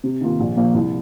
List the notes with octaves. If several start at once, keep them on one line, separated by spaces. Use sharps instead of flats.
C3
D#3 A#3 F4
A#1
A#2 F3 A#3
C2